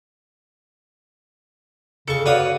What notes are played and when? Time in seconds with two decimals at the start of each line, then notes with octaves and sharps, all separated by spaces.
2.08 C#3 A4 C#6 C#7
2.26 F#4 B4 C#5 D5 F5 D#6